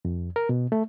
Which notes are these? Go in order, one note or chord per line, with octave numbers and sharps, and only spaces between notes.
F2
A#4
B2
A3